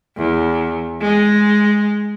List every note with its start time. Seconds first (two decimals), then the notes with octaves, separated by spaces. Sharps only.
0.17 E2
1.01 G#3